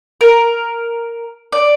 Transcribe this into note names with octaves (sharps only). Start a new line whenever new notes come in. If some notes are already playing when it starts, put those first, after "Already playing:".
A#4
D5